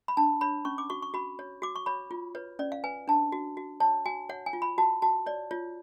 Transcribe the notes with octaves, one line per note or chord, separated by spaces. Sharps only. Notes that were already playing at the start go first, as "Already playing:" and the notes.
B5
D4 A5
C#5 B5
C#4 C#6
D6
F#4 C#6
C#6
F#4 B5
C#5
F#4 D6
C#6
C#5 B5
F4
B4 C#5
C#4 D5
F5
B4 G#5
D4 A5
F#4
F#4
C#5 A5
F#4 G#5
C#5 F#5
G#5
F4
B5
F#4 A5
F#4 A5
C#5 D5
F4 C#5